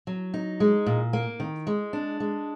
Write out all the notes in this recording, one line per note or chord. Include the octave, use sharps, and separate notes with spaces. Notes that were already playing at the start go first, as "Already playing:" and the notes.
F#3
D#4
G#3
A#2
A#3
D#3
G#3
D4
G#3